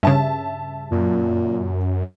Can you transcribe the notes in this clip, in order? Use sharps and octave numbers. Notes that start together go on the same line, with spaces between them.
G2 C#3 E5 A5
F#2 A#2